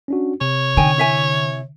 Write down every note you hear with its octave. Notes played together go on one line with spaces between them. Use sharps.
C#4 D4 F#4
C3 C#5
D3 D#4 G5 G#5
E4 E5 G#5